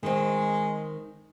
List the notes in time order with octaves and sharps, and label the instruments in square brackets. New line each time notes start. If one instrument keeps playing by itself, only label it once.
[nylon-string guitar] D#3 C4 [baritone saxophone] G#3